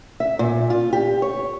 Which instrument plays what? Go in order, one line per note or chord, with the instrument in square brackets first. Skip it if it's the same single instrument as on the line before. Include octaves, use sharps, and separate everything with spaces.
[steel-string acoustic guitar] E5
A#2
F4
G4
C#5